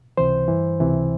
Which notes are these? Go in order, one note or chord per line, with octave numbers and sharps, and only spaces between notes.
C#2 C3 E3 C5
G2 E3
C#2 C3 E3